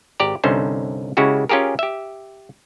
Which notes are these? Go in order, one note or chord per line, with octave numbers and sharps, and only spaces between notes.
G#1 G4 D5 A#5
C2 G2 D3 C#4 D#4 C5
C#3 G#3 C#4 E4 F#4 G4
C#4 F4 G4 G#4 A#4
G4 E5